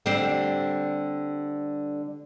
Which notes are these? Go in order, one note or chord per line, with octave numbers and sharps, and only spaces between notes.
D3 G3 C4